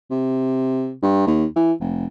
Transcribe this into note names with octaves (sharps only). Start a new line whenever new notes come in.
C3
G2
D#2
E3
F1